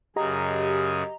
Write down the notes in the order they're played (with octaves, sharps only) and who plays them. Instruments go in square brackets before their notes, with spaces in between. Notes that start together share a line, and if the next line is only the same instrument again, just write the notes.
[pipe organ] F#2 C#3 G#4 [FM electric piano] G4 D#5 A#5